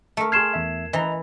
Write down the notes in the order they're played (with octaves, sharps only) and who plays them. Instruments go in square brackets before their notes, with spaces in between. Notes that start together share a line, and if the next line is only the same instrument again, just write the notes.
[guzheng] A3 A#4
[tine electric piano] G#4 C6 F6 [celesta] G#6 C7 E7
[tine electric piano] E2 E5
[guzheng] E3 [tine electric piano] D#5 A#5